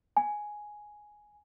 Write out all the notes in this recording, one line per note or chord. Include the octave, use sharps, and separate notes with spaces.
G#5